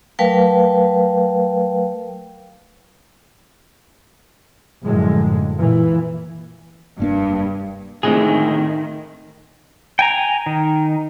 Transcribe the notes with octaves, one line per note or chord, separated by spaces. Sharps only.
F#3 A3 A#4 B4 F5 G5
F#2 A2 D3 F3 G#3
A#2 E3
F1 G2 A#3 D4
D2 A2 C3 D#3 F3 G#3 G#4
G5 G#5 A#5
D#3